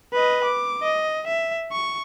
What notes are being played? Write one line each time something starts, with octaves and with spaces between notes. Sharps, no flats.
B4 D#5
D6
D#5
E5
C#6